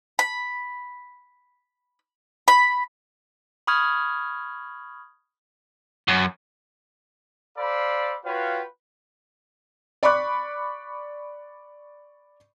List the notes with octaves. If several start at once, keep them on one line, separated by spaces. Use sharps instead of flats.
B5
B5
B5 C#6 D#6 F6 G#6
F#2
A4 C5 D5 F5 B5
F4 F#4 B4 C#5 F5 G5
D5 B5 C#6 D6 F#6